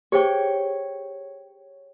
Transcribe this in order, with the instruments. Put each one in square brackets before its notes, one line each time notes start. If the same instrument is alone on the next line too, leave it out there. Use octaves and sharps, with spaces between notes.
[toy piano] G4 G#4 C5 [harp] C#5 G5